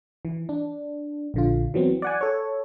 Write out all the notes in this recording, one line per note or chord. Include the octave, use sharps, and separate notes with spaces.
E3
D4
A#1 D3 F4
E3 F#3 B3 C4
D5 F#5 G#5
A4 C#5